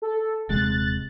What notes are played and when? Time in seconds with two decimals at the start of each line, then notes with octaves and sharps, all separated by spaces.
0.02 A4
0.49 D#1 C3 G#3 F#6 A6